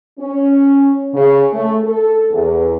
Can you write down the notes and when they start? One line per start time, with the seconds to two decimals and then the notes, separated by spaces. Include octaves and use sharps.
0.20 C#4
1.14 C#3
1.53 A3
1.84 A4
2.31 E2